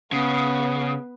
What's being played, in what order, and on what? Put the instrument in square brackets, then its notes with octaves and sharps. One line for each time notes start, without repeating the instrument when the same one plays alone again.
[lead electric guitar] C#3 [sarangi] B3